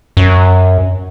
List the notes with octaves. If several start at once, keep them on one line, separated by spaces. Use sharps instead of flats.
F#2